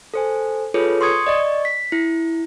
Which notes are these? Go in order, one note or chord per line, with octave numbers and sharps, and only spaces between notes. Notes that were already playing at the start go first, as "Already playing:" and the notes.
A4 C5 G#5
F4 G#4 A4 B4 C#5
C6 C#6 D#6 G#6 C#7
D5 D#5 C#6
B6
E4